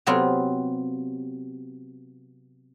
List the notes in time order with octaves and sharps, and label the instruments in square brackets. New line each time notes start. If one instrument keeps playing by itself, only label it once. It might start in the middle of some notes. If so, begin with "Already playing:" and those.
[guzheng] C3 F#3 B3 C4 F4